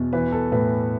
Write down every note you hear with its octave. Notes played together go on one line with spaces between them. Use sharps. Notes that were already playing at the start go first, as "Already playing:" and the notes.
Already playing: E2 B2
E3 B4
A4
A2 B4